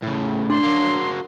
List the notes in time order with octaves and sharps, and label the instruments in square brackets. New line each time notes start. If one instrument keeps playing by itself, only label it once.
[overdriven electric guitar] A2 C#3
[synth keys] D4 [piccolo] C6
[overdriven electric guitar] F#3 A#3